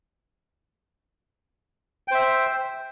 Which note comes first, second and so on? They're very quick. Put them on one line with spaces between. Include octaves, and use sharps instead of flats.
G5 C5 E5